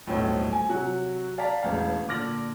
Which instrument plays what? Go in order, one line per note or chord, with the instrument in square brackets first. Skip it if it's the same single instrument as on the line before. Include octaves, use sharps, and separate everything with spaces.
[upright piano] D#1 B1 A2 C4 C#5 G5
G#5
C3 F#3 F#4
D5 F5 A5 A#5 B6
E1 A1 F5
A#2 D3 D6 F6 A#6 F#7